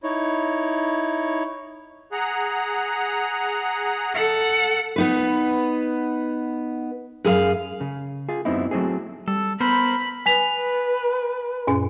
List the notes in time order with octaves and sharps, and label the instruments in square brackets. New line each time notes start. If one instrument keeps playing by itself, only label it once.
[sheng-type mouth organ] D#4 E4 C#5
[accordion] G#4 F#5 A#5
[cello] A4 F#5
[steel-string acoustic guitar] B3 D#4 B4
F#2 G#4 A4 F5
[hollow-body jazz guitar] C#3
F4 G#4
F#2 B3 C4 D#4 E4
F#3 A3 C4 E4 G#4
[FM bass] G3 [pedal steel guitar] A4
[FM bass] B3 [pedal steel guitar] A#4 C5 [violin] B5
[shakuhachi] B4 [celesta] G#5 B6 F7
[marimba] F#2 A#2 C#4